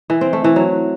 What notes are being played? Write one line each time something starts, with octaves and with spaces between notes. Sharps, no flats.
E3
C4
A3
E3
F#3